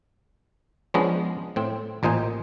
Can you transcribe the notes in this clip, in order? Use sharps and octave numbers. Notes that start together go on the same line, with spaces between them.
F3 G#3 B3 C#4 D4 D#5
A2 C4
A1 A#2 D#4 C5 G#5